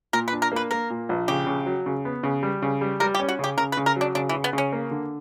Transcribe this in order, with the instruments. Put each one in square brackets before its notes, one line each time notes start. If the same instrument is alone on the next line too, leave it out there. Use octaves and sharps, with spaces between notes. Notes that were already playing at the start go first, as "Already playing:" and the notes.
[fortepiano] A#2 [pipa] A#4
[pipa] B4
[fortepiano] D4
[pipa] A#4
[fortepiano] A#3 [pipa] B4
[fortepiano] A#3 [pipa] A#4
[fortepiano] A#2
A#1
[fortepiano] C#3 [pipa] G4
[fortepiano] C#3
F#3
C#3
B3
C#3
G3
C#3
G3
[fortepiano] G3 [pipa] A#4
[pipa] G4
[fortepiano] C#4
[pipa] F#4
[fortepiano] C#3 [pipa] G4
[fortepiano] C#3 [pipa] A#4
[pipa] B4
[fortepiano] C#3
[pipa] A#4
[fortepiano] F#3 [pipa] D4
[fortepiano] C#3 [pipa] D4
[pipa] E3
[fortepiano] C#3
[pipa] B3
[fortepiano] C#3
[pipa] C#4
[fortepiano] A#3
D3